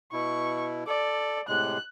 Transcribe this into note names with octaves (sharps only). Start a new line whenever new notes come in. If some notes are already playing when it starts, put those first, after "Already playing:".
B2 E4 C#6
A4 D5
A2 C3 G#3 F#6